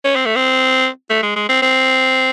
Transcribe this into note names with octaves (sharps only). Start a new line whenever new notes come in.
C#4
C4
A3
C4
A3
G#3
G#3
C4
C4